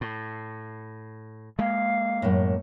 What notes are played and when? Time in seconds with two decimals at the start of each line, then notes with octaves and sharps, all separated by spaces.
0.01 A2
1.59 G#3 A#3 F5
2.22 F#2 A2